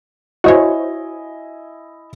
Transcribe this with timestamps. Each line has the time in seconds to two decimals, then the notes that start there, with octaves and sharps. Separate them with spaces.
0.44 E4 F#4 C5 C#5 D#5 G#5